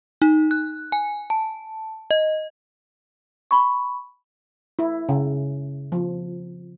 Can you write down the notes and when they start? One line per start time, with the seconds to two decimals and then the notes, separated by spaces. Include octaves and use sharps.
0.22 D#4
0.51 F#6
0.92 G#5
1.30 A5
2.11 D#5
3.51 B5 C#6
4.79 E4
5.09 C#3
5.92 F3